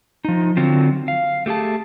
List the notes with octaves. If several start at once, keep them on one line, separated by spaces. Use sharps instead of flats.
F3 D#4
D3 F#3 C4 F4
F5
A3 G4 G#4 A5